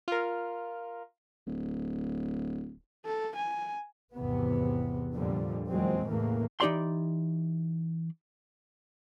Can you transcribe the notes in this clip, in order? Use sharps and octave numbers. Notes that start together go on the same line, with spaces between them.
F4 A#4
D1
A4
G#5
G#1 E2 C3 B3
F2 A#2 D3 F3 G3
E2 A#2 F#3 G#3 C4
E2 A2 C#3 E3 A3 A#3
E3 D#4 G4 D5 C6